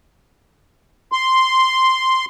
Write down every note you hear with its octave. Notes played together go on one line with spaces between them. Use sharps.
C6